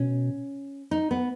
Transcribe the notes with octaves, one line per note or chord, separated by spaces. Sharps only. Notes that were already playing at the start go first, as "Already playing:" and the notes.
Already playing: B2 C#4
D#4
B3